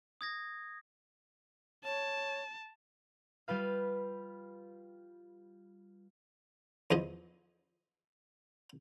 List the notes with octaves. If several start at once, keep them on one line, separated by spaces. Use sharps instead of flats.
D#6 G#6 A#6
C#5 A5
G3 F4 B4 F5
E2 F3 D#5